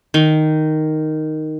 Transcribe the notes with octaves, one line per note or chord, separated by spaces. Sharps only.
D#3